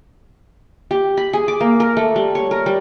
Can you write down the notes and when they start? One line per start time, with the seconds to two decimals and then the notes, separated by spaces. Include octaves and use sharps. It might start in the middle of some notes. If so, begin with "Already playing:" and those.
0.91 G4
1.17 B5
1.33 G#4
1.48 D6
1.60 A#3
1.80 A#4
1.97 A3
2.16 G3
2.35 C#5
2.51 A#4
2.66 G3